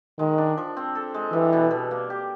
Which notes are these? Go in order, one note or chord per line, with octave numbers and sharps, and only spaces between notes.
D#3 G#3
D4
F3
C4
A4
G#3
E3 G3
B2
B2
A#3
G4